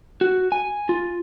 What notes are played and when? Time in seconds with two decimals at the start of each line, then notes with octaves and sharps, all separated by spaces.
0.21 F#4
0.52 G#5
0.89 F4